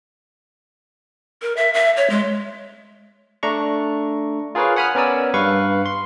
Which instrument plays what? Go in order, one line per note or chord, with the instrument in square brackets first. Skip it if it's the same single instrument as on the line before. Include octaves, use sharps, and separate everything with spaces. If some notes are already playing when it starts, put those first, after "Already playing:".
[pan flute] A#4
E5
E5
C#5
G#3
[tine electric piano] A3 D4 A#5 C#6
F4 G#4 A#4 B4 C#5 F5
F#5 G#5 B5 D#6 F6
B3 C#4 A#4 D5 G#5 E6
G2 B4 F5 C#6
C6